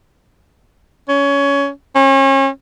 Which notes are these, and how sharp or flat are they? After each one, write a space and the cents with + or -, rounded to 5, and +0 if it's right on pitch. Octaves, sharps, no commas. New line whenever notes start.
C#4 +20
C#4 -35